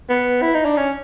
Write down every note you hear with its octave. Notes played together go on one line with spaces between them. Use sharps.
B3
E4
D#4
D4
C#4